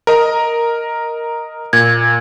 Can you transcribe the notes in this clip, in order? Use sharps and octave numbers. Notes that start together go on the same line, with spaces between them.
A#4 D#5 A#5
A#2 G#6